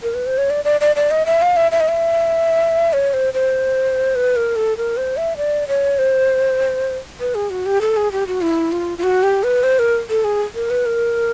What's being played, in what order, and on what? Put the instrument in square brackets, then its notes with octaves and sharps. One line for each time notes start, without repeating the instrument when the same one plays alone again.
[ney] A#4
B4
C5
C#5
D5
D5
D5
D5
D#5
E5
F5
E5
E5
D#5
E5
C#5
C5
C5
B4
A#4
A4
A#4
C5
E5
D5
C#5
C5
B4
G#4
F#4
G4
A4
G#4
G4
F#4
E4
F4
F4
F#4
G4
B4
C5
A#4
A4
G#4
A#4
B4
A#4